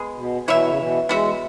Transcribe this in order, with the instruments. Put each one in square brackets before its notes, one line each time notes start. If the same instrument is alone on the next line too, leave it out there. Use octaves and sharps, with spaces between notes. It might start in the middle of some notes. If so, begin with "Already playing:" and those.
Already playing: [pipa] G#3 B3 G#4
[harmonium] B2
[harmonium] B2 E3 [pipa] F#3 E4 C#5 E5
[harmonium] C#3
B2 E3
[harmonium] E3 G#3 [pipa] B3 F#4 E5